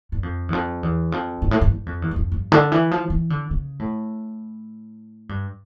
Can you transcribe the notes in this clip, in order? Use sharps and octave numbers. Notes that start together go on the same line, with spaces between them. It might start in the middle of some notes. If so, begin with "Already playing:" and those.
G2
F2
E2
F2
E2
F2
G2
A2
G2
G2
F2
E2
G2
F2
G2
D3
E3
F3
E3
D3
C#3
A2
G2